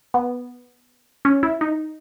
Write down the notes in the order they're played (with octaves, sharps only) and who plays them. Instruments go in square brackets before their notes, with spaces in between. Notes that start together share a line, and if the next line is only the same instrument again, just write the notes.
[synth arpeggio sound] B3
C#4
E4
D#4